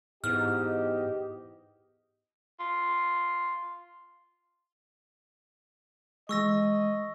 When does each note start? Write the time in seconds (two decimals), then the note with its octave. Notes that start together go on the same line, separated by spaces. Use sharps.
0.24 E2 G#2 G4 D#5 F6
2.60 F4
6.29 E3 G#3 D#5 C#6 E6 A#6